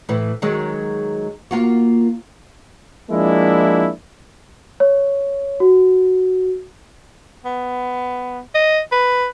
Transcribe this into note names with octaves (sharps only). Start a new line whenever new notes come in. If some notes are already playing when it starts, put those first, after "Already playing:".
A2 E3
D#3 F#3 G#3
A#3 F4 F#4
F3 G#3 A#3 D4 E4
C#5
F#4
B3
D#5
B4